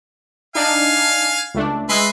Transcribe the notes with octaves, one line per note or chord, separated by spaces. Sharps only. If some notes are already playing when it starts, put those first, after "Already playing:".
D4 D#4 F5 G#5
C#2 A3 D4
G#3 B4 D#5 E5 C6